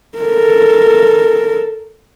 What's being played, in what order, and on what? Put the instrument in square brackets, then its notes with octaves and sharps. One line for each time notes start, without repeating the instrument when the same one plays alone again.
[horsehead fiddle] A4 A#4